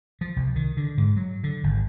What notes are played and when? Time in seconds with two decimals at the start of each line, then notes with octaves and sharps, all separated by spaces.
0.21 F3
0.36 C2
0.56 D#3
0.77 D3
0.97 G#2
1.16 F#3
1.43 D3
1.63 G#1